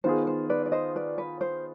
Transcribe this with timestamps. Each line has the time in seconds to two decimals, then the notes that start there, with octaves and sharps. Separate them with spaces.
0.04 D#3 B3 F4 G#4 C5
0.27 C5
0.50 B4 D5
0.66 D5
0.72 C5 D#5
0.96 B4 D5
1.18 B4
1.41 C5